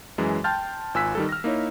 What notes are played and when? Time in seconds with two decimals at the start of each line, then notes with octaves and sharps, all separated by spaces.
0.18 F#2 E3 G#3
0.44 G5 A5 C6 F6 G6 A6
0.94 G#1 F4 G#5 E6 F#6 B6
1.15 D#3 G3 A4
1.29 F6 A#6
1.44 A#3 D#4 E4 C#5